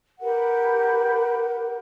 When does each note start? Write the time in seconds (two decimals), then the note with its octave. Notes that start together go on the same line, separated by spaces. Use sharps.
0.21 G4 A#4 B4 F#5